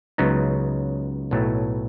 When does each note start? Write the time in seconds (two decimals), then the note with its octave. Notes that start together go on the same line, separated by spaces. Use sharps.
0.18 C#2 C#3 F#3 B3 D#4
1.31 B1 A2 F#3 A3